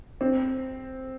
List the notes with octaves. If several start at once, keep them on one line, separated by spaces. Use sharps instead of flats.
C4